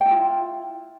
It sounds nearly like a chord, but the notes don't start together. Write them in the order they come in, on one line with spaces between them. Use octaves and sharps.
G5 E4 F4